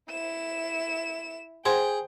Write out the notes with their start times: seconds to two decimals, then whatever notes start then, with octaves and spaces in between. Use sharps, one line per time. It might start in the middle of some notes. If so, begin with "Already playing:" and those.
0.10 E4 E7
1.65 G#4 C5 F#5 G5 C6